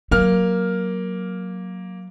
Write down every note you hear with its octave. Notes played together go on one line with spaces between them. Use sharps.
F#3 A#3 F6